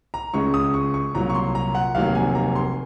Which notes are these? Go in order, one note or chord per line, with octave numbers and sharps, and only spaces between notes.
A#5
C#2 C#3 G#3 C#6
D#6
C#6
C#6
C2 A#2 F#3 A#3 A#5
C#6
C6
A#5
F#5
F1 D#2 D#3 F#3 A#3 F5
G#5
A#5
C6